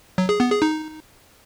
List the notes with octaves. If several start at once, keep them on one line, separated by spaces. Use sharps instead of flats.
F#3
G#4
B3
G#4
D#4